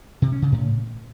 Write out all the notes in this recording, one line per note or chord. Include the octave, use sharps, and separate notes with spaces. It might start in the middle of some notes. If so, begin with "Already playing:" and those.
C3
C#4
C#3
A2